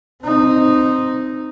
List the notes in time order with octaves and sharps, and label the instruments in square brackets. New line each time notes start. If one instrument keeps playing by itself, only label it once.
[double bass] C4 D#4